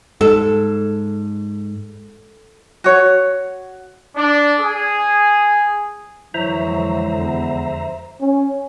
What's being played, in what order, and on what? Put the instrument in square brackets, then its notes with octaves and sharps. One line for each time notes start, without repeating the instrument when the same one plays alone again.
[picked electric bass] G#2 [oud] A4
[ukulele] F#4 C#5
[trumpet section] D4
G#4
[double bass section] F2 D3 G#3 [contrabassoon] E3 [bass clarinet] F#3 [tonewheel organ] C5 E5 A#5
[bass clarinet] E2
[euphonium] C#4